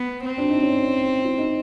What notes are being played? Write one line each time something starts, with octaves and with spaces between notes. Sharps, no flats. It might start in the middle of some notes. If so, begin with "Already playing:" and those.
Already playing: B3
C4
D4
D#4
C#4
E4
D#4